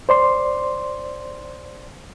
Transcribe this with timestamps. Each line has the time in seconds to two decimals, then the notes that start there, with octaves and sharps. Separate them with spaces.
0.09 C5 D5 C6